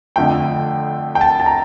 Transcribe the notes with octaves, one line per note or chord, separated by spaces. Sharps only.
F2 D3 F3 A3 G5
G5
A5
A5
A#5